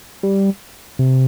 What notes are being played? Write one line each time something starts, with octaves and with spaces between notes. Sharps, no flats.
G3
C3